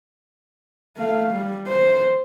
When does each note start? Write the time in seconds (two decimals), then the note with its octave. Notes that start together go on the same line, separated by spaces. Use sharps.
0.97 A3 F5
1.31 G3
1.67 C5